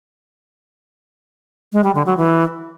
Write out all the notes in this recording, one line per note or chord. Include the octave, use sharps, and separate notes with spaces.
G#3
G3
D3
F#3
E3